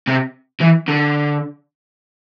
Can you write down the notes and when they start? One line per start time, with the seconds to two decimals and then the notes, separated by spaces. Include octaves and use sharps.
0.07 C3
0.61 E3
0.88 D3